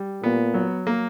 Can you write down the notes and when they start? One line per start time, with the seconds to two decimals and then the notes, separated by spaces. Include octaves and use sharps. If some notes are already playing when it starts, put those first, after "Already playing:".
Already playing: G3
0.23 A#2 B3
0.54 F#3
0.87 A#3